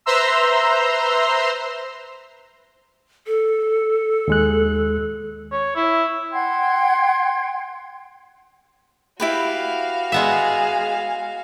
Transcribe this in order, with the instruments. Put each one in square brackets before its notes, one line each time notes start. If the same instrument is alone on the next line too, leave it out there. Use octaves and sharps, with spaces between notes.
[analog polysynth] B4 C5 E5 A#5 C6 E6
[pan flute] A4
[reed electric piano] D#2 G#3 F#6
[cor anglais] C#5
E4
[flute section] F#5 G5 C6 G#6
[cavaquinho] E4 G4 B4 [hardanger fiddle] F#4 F5
[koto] G#3 B3 E5 [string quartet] G#4